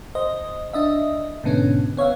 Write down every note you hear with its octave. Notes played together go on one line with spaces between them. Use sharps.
C5 D#5
D4 D#5 E5
G#2 B2 D3 B3 C#4
B3 C#5 E5 F5